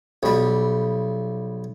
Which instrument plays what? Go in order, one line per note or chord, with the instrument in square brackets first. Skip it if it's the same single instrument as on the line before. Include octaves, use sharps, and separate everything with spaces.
[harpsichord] B1 G3